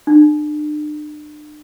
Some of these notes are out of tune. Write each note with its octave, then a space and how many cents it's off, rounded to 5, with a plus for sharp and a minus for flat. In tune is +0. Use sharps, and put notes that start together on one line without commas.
D4 +40